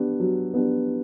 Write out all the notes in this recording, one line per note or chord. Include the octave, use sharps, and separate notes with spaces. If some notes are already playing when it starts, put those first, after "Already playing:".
Already playing: B3 D4 G4
F#3
B3 D4 G4